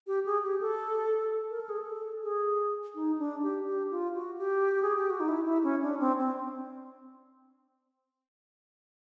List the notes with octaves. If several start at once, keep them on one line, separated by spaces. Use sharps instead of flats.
G4
G#4
G4
A4
A#4
A4
G#4
A4
G#4
D#4
D4
G4
G4
F4
F#4
G4
G#4
G4
F#4
D#4
E4
E4
C#4
D4
C4
C4